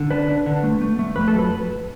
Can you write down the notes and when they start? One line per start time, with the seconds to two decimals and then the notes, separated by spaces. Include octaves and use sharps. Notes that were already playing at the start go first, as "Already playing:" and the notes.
Already playing: D3
0.11 D4 B4
0.29 D4
0.46 D3
0.63 A3
0.81 A3
0.99 A3
1.16 F2 B4
1.28 A4
1.34 F#3
1.39 B4